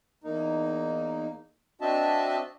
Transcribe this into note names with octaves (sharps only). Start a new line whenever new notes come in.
E2 A#3 D#4
C4 D4 F#4 D#5 E5 A5